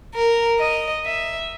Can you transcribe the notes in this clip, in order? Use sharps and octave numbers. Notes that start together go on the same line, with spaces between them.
A#4
D#5
E5